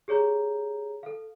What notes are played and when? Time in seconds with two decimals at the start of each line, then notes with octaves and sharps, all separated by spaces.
0.08 G4 G#4 C#5 A#5 G6
1.03 A4 F5